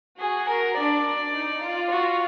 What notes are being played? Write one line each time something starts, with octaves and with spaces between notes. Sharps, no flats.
F#4 G#4
A#4
D4 D5
D4
D#4
F4
F#4